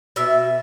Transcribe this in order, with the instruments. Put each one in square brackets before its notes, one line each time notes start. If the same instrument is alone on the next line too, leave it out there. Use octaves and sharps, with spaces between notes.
[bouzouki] B2 E5